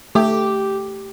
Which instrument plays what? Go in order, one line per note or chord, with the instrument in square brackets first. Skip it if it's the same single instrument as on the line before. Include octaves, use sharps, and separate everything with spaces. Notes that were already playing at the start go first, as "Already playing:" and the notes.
[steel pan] A3 [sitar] G4